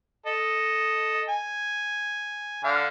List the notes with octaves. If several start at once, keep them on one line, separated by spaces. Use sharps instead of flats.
A4 D#5
G#5
D3 F5